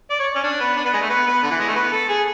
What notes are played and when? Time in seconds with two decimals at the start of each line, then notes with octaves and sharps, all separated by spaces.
0.10 D5
0.20 C#5
0.36 C#4
0.44 D4
0.60 B3
0.76 D4
0.85 B3
0.93 G#3
1.02 A3
1.10 B3
1.27 B3
1.43 D3
1.51 E3
1.60 G#3
1.68 A3
1.76 B3
1.92 A4
2.09 G#4